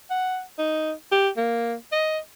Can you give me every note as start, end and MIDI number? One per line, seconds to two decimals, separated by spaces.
0.10 0.41 78
0.58 0.92 63
1.12 1.29 67
1.37 1.75 58
1.92 2.19 75